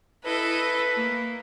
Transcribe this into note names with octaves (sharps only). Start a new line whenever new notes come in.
E4 A4 B4 D#5
A#3